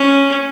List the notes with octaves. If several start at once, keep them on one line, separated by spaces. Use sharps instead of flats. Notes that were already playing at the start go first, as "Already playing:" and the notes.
Already playing: C#4